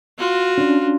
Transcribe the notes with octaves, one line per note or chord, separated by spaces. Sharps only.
F4 F#4
C#4 D4